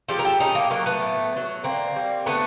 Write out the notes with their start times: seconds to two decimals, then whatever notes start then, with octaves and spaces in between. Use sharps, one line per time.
0.09 F3 G#3 G4 A4
0.19 A#4
0.25 G4 A4
0.39 A2 C#4 D#4
0.55 A#3
0.71 F#3 A3 A#3
0.86 A3 B3
1.02 A2
1.33 F#3 A3
1.64 D3 A#3 C4
1.96 G3
2.26 D3 A3 B3